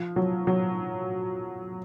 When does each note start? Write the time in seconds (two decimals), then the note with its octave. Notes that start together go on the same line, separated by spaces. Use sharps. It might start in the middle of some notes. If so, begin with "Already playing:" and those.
Already playing: F3
0.16 F#3
0.47 F#3